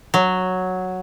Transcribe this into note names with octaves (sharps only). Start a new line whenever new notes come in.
F#3